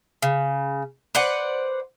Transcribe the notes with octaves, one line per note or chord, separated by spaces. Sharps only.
C#3
B4 C5 D5 F#5